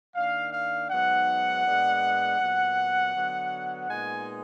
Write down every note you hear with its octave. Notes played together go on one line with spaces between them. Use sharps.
D#3 A#3 D4 F5
F5
G#2 F#3 B3 D#4 F#5
A#2 G#3 B3 D4
A#2 F#3 B3
D3 F#3 B3
A#2 G#3 B3 D#4 G#5